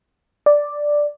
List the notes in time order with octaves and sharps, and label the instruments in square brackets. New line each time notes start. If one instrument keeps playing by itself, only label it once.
[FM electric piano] D5